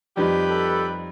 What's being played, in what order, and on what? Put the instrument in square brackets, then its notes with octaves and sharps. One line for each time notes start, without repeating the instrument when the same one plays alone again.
[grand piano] F2 G3 D#4 [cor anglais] G4 [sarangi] B4
[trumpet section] A4